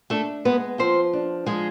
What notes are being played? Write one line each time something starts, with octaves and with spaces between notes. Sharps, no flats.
A3 D4 A4
G#3 B3 B4
F3 C4 C5
D4
F3 G#3 G#4